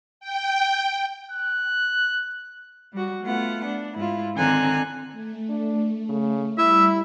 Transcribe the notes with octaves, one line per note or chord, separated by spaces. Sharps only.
G5
F#6
G3 F#4
A3 B3 F4 F#5
D4
G#2 E4 F4
D3 D#3 C4 G#5 A#5 F#6
A3
D4
C#3
G3 E4 E5